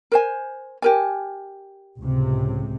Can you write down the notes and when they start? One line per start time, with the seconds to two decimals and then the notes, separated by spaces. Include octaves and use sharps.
0.12 A#4 C5 G#5
0.82 G4 A#4 G#5
1.97 C#2 A2 C3